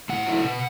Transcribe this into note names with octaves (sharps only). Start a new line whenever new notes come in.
A2 F#5
F#3 A3 E4
B2